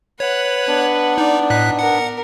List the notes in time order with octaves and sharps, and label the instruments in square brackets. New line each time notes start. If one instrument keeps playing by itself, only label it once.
[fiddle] B4 F#5 [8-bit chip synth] C#5
[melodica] B3 D4
[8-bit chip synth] D#4 [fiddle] D5
[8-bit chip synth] A2 F#6 B6 [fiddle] D#4
[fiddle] A#4 [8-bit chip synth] F#5